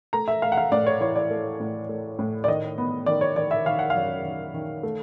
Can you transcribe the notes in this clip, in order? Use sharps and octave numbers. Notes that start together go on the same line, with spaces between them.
A3 A#5
E5
A3 F5
F#5
F5
A2 D5
C#5
E3 C#5
D5
A3
A2
A3
A2
D5
D#3 D#5
B3
D#3 D5
C#5
D#3 D5
E5
D#3 F5
F#5
F5
F#2
D#3
D#3
A3